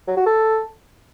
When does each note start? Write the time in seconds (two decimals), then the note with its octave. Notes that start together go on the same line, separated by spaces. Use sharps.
0.08 F#3
0.17 F#4
0.26 A4